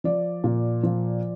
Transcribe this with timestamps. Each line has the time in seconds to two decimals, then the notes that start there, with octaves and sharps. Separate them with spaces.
0.04 F3 D5
0.44 A#2
0.83 F3